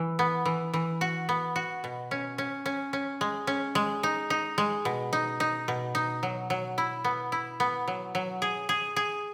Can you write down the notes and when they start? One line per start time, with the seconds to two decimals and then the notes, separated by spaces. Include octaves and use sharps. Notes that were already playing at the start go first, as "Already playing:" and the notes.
Already playing: E3
0.19 B3
0.45 E3
0.73 E3
1.01 F#4
1.29 B3
1.56 F#4
1.84 B2
2.11 C#4
2.38 C#4
2.66 C#4
2.93 C#4
3.21 G#3
3.47 C#4
3.75 G#3
4.03 D#4
4.30 D#4
4.58 G#3
4.85 B2
5.13 D#4
5.40 D#4
5.68 B2
5.95 D#4
6.23 F#3
6.50 F#3
6.78 E4
7.04 B3
7.32 E4
7.60 B3
7.88 F#3
8.15 F#3
8.42 G#4
8.69 G#4
8.96 G#4